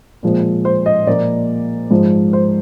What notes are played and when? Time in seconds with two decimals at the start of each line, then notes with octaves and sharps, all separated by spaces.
0.23 A#2 F3 G#3
0.65 C5
0.86 D#5
1.07 A#2 F3 A#3 D5
1.91 G#2 F3 G#3
2.33 C5